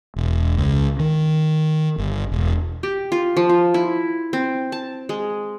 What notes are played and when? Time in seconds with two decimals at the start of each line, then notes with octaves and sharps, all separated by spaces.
0.16 E1
0.58 C#2
0.99 D#3
1.98 G1
2.32 E1
2.83 G4
3.12 F4
3.37 F3
3.49 F4
3.74 E4
4.33 C4
4.72 A5
5.09 G#3